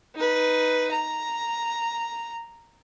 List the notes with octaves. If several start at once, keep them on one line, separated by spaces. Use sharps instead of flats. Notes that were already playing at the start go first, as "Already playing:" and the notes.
D#4 B4
A#5